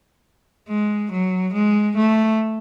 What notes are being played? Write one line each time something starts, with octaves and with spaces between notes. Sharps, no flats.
G#3
F#3
G#3
A3